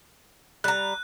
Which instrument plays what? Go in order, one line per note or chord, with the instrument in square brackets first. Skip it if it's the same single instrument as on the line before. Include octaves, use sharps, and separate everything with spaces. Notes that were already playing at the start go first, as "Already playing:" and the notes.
[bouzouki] G3 A#5 [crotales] F#6